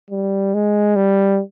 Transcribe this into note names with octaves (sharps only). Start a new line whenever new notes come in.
G3
G#3
G3